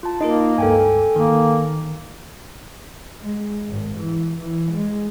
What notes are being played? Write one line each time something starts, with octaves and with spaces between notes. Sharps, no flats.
F4 A5
A#3 D#4 F4 A#4 D#5
C#2 G2 A4 G5 G#5
D#3 A#3
G#3
G#1
E3
E3
G#3